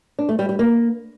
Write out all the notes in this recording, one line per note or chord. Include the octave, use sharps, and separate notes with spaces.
D4
A3
G3
G3
A#3